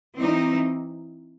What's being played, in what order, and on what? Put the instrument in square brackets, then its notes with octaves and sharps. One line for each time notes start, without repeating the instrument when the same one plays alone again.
[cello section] E3 C4 D#4